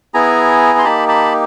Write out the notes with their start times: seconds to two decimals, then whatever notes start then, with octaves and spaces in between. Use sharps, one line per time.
0.14 B3 E4 G#4 G#5 A#5
0.79 C6
0.84 A#3 D#4 G4 A5 B5
1.08 A5 B5